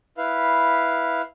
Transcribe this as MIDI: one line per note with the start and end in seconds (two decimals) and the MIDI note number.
0.17 1.22 64
0.17 1.22 71
0.17 1.22 77